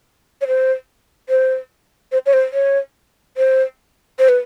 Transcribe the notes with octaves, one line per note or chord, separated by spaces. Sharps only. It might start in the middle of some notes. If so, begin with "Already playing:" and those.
C#5
C5
C5
C5
C#5
C5
C#5
C5
C5
B4